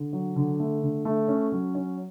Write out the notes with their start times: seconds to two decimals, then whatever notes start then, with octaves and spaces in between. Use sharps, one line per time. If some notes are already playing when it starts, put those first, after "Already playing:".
Already playing: D3
0.13 F#3
0.36 D3
0.60 A3
0.83 D3
1.05 A3
1.28 C#4
1.52 F#3
1.75 C#4